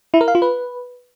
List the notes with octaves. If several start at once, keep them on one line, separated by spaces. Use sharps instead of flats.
E4
A#4
F5
F4
B4